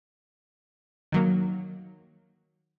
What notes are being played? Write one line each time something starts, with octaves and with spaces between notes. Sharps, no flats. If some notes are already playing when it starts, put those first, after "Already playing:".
D#3 F#3 A#3